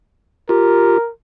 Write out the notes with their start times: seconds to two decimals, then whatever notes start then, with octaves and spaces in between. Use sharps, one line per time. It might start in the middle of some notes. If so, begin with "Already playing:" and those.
0.49 F4 G4 A#4